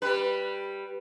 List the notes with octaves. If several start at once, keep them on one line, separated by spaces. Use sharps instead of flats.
G3 B4